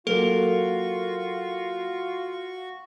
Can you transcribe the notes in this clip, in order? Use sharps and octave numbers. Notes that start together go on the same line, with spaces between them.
F#3 A#3 F4 F#4 A4 C#6